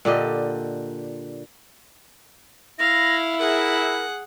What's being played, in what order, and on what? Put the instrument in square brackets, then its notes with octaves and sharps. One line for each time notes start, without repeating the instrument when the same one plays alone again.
[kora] A#2 D3 G4 D#5
[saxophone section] E4 [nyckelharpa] F5 [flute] A#6
[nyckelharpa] G#4 F#5 [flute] A#4